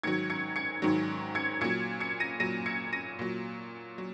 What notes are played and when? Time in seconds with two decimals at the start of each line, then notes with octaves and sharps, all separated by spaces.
0.03 G#2 D#3 F#3 G#6 C#7
0.30 G#6 C#7
0.56 G#6 C#7
0.82 G#2 D#3 F#3
1.35 G#6 C#7
1.61 A#2 F#3 G#6 C#7
2.00 G#6 C#7
2.20 A#6 D#7
2.40 A#2 F#3 A#6 D#7
2.66 G#6 C#7
2.93 A#6 D#7
3.19 A#2 F#3
3.98 F#3